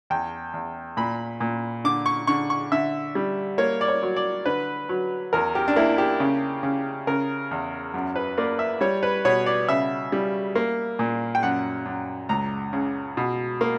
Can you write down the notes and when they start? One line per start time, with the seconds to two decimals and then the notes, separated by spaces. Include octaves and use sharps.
0.10 E2 G5
0.53 E2
0.97 A#2 B5
1.40 A#2
1.84 D3 D6
2.06 C#6
2.27 D3 C#6
2.50 C#6
2.72 D3 E5
3.15 G3
3.58 A#3 C#5
3.81 D5
3.88 C#5
4.03 F#3
4.16 D5
4.46 D3 B4
4.89 F#3
5.33 E2 A#4
5.55 G4
5.68 D4
5.76 A#3 E4
5.98 G4
6.20 C#3
6.63 C#3
7.07 C#3 A#4
7.51 E2
7.94 F#2
8.16 B4
8.38 A#3 D5
8.59 E5
8.81 G3 C#5
9.03 B4
9.25 B2 C#5
9.46 D5
9.69 C#3 E5
10.12 G3
10.55 A#3
10.99 A#2
11.35 G5
11.43 F#2 F#5
11.86 F#2
12.29 C#2 A#5
12.73 C#3
13.17 B2
13.61 A#3